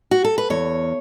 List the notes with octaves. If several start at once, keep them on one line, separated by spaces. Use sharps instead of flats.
F#4
A4
B4
E2 C#5